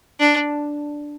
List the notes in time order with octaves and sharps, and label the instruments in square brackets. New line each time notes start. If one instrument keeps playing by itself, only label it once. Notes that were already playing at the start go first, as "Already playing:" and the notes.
[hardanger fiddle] D4